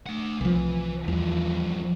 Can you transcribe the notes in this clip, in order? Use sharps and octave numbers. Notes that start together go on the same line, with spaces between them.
A3 F#5
C2 E3 F3
E2 G2 F3